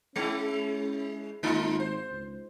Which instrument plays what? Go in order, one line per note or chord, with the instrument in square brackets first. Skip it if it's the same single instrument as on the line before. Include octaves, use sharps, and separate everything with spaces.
[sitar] G#3 E4 [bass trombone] C#4
[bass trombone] G#1 [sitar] A3 D#4 F4
[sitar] C5
[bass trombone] C#2